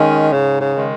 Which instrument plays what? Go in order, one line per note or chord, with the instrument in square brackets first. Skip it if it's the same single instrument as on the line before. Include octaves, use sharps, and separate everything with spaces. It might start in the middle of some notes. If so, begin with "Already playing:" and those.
Already playing: [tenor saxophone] D#3 [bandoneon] G#3 C#4
[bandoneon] G#2 [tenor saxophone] C#3
[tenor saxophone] C#3
[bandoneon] D#3 G#3